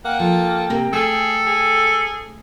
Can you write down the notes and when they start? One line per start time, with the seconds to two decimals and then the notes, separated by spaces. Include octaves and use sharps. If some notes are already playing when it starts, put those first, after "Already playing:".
0.05 A#3 F#5 G5
0.19 F3 A4
0.70 C3 A#3 A#4
0.93 A3 G#4 A4
1.46 G#4